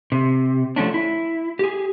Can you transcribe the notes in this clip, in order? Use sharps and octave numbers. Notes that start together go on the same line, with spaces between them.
C3
F3 A3 C#4 D4
E4
G4 G#4